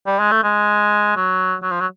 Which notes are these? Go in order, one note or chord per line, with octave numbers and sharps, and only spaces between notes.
G3
G#3
A3
G#3
F#3
F#3
F3
F#3